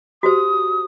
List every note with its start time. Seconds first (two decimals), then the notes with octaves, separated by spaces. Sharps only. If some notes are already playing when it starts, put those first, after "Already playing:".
0.23 F#4 G4 C5 D#6